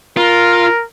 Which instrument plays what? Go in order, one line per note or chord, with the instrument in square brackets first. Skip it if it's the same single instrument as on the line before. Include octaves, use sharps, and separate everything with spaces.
[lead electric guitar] F4 [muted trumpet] A#4